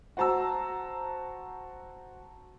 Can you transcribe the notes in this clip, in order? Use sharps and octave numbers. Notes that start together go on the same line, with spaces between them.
F#4 C5 A5 A#5 E6